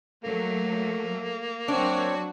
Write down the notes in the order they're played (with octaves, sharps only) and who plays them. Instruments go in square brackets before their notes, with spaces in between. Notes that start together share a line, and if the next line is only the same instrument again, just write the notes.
[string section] F#3 A3 [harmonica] A#3
[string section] F#3 F#4 [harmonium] C4 C#5 [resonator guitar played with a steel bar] D4